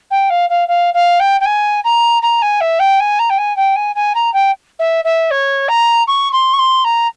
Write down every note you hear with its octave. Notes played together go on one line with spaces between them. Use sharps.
G5
F5
F5
F5
F5
G5
G5
G#5
A#5
A#5
G#5
E5
G5
G#5
A#5
G5
G#5
G5
G#5
G#5
A#5
G5
E5
E5
C#5
A#5
C#6
C6
C#6
C6
A#5